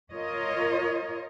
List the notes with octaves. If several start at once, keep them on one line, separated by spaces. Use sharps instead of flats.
F4 A#4 C#5 D#5